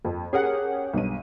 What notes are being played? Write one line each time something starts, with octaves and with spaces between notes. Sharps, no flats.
F2
C#4 G4 G#4 A#4 F#5
B1 G2 D#7